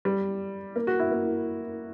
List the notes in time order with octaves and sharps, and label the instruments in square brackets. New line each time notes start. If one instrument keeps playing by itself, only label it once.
[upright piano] G3
A#3
F#4
E4
A#3